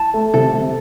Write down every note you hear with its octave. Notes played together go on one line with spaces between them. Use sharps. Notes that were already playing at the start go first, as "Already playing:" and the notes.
Already playing: A5
A3
C3 A4
C3